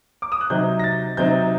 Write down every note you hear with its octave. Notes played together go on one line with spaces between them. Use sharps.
D6
D#6
F#6
C3 F#3 C4 D#4 G6
A#6
A6
C3 F#3 C4 D#4 G6